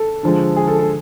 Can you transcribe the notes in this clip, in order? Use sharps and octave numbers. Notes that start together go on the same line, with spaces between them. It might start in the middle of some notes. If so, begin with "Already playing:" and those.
Already playing: A4
D3 F3 G#3
G#4
A4
A4